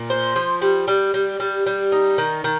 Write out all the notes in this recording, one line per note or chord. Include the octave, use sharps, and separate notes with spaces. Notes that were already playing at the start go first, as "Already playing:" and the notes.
Already playing: A#2
C5
F3
G3
G3
G3
G3
G3
D#4
D#3
D#3